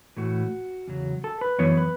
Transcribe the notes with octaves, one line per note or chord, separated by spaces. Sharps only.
A2 E3 A3 F#4
E2 C#3 F#3
A4
B4
F#2 E3 B3 C#5
B4